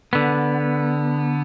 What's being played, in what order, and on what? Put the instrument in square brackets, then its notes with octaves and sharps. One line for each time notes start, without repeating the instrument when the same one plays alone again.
[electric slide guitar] D3 B3